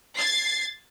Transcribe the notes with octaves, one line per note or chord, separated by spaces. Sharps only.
G#6 A6 C7